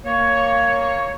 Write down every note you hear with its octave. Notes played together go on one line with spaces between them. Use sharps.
A#3 C#5